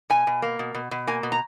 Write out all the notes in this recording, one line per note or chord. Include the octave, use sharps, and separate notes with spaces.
B2 G#5
B2
A#3
B2
B2
B2
A#3 G#5
B2
A#5